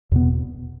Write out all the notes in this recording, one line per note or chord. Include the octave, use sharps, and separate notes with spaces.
E2 B2 B3